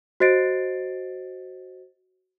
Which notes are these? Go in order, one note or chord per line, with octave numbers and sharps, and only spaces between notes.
F#4 C5 D#5 A6 C7 D7